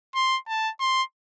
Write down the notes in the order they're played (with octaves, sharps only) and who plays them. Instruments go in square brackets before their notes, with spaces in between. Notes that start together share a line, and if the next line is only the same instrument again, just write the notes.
[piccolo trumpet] C6
A5
C6